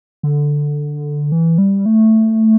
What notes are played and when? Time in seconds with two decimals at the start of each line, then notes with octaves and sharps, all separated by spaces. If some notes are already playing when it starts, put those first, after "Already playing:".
0.23 D3
1.32 E3
1.58 G3
1.86 A3